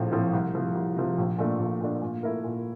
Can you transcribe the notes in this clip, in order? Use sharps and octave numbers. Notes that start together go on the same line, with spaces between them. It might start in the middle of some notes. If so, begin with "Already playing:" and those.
Already playing: A#1 A2 F3 C4
A2 F3 C4
C2
C3 F3
C2
C3 F3
A#1
A#2 A3 D4
A#1
A#2 A3 D4
A#2
A3 E4 A#4
A#2